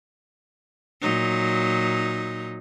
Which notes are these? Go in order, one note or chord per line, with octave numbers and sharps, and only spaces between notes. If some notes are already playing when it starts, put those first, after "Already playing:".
A#2 F#3 D#4